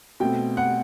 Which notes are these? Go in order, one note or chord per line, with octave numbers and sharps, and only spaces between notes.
B2 A3 C4 G5
F#5